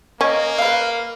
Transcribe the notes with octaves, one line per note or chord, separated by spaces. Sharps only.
A#3 C#4 D#5
A#4 B4 F5